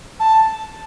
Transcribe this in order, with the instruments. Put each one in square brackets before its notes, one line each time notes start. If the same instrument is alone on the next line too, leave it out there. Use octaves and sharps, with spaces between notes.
[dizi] A5